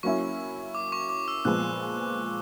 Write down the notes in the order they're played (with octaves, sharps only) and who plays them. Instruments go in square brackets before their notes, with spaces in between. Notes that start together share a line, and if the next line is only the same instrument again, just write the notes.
[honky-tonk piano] F#3 A#3 C#4 E4 [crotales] C#6
[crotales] D6
C#6
D6
E6
[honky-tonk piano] A#2 F3 G#3 B3 [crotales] F#6